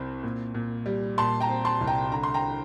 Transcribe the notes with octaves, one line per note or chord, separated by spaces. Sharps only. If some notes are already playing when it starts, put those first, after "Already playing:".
Already playing: C2 C4
A#2
A#2
G3
A#2 A5 C6
G5 A#5
C4
A5 C6
C2
G5 A#5
D3 A#5
C6
G5 A#5